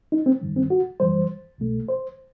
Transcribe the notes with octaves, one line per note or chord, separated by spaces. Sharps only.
D#4
C4
G2 D#3 G3
C4
F#4
F#2 E3 G3 C5
C2 B2 A3
C5